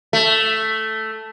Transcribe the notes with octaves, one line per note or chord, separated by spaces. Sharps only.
A3